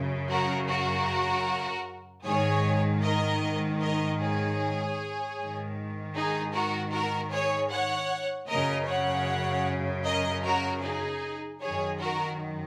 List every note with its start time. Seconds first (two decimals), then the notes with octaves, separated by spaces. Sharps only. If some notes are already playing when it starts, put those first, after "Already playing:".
Already playing: F#2 C#3
0.31 F#4 A#4
0.69 F#4 A#4
2.25 G#2 D#3 G#4 C#5
3.03 A#4 D#5
3.81 A#4 D#5
4.21 G#4 C#5
5.38 G#2 D#3
6.15 D#4 G#4
6.54 F#4 A#4
6.94 F#4 A#4
7.32 G#4 C#5
7.71 C#5 F#5
8.49 F#2 C#3 A#4 D#5
8.88 C#5 F#5
10.05 A#4 D#5
10.45 F#4 A#4
10.83 D#4 G#4
11.61 F#2 D#3 G#4 C#5
12.00 F#4 A#4